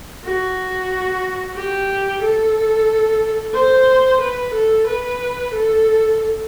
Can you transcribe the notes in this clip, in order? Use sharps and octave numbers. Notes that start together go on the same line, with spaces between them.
F#4
G4
A4
C5
B4
A4
B4
A4